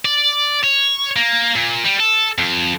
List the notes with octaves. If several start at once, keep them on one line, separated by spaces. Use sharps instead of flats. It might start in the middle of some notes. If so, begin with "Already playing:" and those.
D5
C#5
A#3
A#2
G3
A4
F2